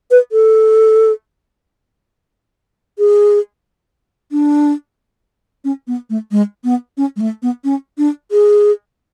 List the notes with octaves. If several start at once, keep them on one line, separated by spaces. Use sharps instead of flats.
B4
A4
G#4
D4
C#4
B3
A3
G#3
B3
C#4
G#3
A3
B3
C#4
D4
G#4